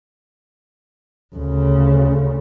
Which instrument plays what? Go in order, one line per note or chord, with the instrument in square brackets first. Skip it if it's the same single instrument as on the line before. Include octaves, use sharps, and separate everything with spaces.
[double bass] D2 C#3